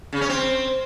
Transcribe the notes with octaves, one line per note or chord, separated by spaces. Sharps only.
C#3
C#4
C4